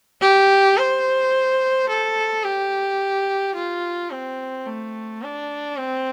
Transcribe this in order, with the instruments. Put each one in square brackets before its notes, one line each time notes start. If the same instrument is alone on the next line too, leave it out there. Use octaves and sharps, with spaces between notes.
[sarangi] G4
C5
A4
G4
F4
C4
A3
D4
C4